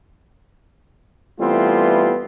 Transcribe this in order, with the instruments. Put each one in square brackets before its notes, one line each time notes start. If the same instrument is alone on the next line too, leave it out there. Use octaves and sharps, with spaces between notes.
[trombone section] E3 G3 A3 B3 C4 F4